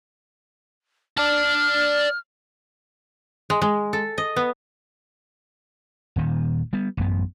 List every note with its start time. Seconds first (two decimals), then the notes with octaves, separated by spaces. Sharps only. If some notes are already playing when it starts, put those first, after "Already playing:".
1.17 D5 A5 F6
3.50 G#3
3.62 G#3
3.93 A4
4.18 D#5
4.36 B3
6.16 D#1 A#2 D#3
6.73 G3 B3
6.97 A1 F#2 B3